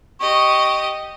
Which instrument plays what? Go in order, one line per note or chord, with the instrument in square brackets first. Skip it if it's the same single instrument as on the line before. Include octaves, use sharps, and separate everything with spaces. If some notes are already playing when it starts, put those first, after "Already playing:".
[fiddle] G4 D#5 [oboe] C#6